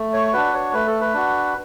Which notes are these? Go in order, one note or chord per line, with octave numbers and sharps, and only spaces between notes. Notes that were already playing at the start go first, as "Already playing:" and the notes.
Already playing: A3
C#5
D4 F#4 B4
C#5
A3 B4
A4
B4
D4 F#4